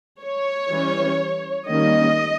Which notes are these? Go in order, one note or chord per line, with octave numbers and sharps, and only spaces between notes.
C#5
E3 G3 C#4
D#3 G3 A#3 C#4 D#5